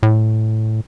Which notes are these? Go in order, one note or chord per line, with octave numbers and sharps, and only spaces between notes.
A2